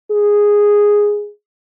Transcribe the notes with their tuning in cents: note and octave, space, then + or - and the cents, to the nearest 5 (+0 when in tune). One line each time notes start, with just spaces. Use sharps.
G#4 -5